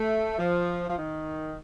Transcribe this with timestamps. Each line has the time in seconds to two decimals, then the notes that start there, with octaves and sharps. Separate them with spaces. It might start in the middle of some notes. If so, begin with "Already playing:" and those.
Already playing: A3
0.39 F3
0.89 F3
0.97 D#3